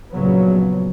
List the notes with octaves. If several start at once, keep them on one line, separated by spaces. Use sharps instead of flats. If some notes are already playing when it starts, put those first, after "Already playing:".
A#1 C#3 F#3 B3